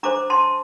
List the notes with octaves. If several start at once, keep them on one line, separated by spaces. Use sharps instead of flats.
D4 A4 C5 A#5 D6
A5 C6